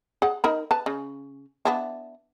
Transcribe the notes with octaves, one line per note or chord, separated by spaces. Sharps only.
G#4 F#5
D#4 A#4 B5
B4 A5
C#3
B3 D4 E4